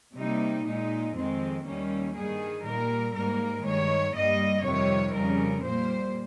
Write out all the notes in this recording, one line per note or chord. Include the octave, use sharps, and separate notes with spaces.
C3 G3 A#3 D#4
A#2 G#3 D#4
F2 D#3 G#3 C4
D#2 D#3 G3 A#3 C#4
G2 D#3 G3 G#4
A#2 G3 A#3 A#4
G#2 G3 A#3 A#4
G2 D#3 G#3 C#5
G2 G3 A#3 D#5
F2 C3 D#3 G3 C#5
F2 C#3 G3 A#4
A#2 G3 A#3 C5